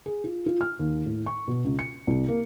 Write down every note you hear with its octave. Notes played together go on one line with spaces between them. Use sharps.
G#4
F4
F4
F6
D#2
A2
C#6
B2
C#2
C#7
C2
A#3